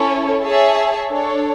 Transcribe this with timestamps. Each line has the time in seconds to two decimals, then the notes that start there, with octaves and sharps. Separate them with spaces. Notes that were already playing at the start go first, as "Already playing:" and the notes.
Already playing: C#4 E4 A4 C#5
0.43 G#4 C#5 E5 A5
1.08 D4 A4 C#5